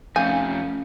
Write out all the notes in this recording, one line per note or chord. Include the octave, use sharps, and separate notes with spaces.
F2 A3 C#4 F5 G#5 G6